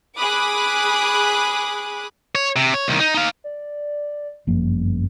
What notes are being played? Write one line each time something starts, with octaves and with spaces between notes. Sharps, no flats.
G#4 B5 D6 D#6 F#6
C#5
C3
C#5
C2 D#3
D#4
D#4 F5
D5
G1 F#2 F3 A#3